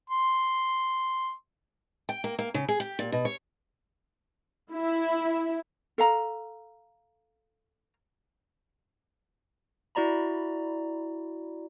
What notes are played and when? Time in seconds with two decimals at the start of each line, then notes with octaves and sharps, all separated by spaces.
0.10 C6
2.09 G5
2.24 A#3
2.39 A#3
2.54 C#3
2.68 G#4
2.80 G4
2.99 A#2
3.12 B2
3.25 C#5
4.71 E4
5.98 A4 F5 A#5
9.95 E4 F#4 D5 A#5 B5